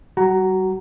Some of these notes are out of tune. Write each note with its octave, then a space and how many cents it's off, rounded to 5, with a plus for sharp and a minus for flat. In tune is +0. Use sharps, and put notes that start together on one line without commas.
G3 -35 F#4 +20 A#5 -5